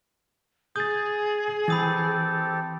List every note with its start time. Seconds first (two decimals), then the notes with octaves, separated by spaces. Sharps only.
0.76 G#4 D#6 G6 A6
1.68 E3 C4 G4 A4 B5 D#6 A6